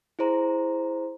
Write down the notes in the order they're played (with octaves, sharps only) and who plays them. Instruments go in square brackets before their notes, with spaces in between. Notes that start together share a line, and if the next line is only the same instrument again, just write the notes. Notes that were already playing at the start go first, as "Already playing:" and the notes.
[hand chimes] E4 G#4 C5 A#5